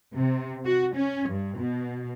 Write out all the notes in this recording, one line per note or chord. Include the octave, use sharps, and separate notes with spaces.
C3
F#4
C#4
G2
B2